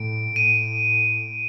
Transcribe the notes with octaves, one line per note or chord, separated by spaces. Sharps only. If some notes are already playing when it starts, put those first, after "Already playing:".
Already playing: A2 D7
A2 D#7